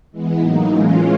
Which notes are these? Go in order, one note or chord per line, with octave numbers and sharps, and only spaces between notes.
E3 G#3 B3
A2 F#3 A#3 D#4
E3 G#3 C#4 F4